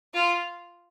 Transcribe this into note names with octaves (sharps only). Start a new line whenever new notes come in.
F4